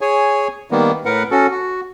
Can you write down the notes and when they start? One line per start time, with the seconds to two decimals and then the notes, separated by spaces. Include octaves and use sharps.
0.01 G#4 C#5 G#5
0.71 D#3 G3 A#3 B3
1.05 A2 A#4 B4 F#5
1.31 C#4 F#4 A4
1.51 F#4